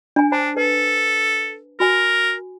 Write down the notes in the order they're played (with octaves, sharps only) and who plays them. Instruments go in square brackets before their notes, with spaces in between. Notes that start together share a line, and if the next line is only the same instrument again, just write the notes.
[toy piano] D4 G#5
[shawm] D4 [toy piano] C5 A5
[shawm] A4 [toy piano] B4
[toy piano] F#4 G#5 [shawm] A#4